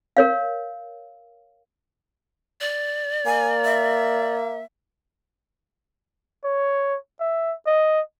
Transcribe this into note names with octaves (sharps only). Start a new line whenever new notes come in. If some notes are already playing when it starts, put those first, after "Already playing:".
A#4 C#5 F5
D5
A#3 G#5
E5
C#5
E5
D#5